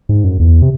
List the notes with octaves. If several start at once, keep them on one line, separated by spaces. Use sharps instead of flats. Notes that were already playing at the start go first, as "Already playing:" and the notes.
G#2
F#2
E2
C3